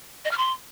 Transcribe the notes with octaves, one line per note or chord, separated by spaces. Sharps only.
D#5
F6
C6